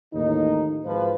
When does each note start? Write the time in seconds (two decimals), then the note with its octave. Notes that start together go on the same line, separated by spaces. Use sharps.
0.13 A1 D#2 A2 F3 D#4
0.85 G#1 F3 B4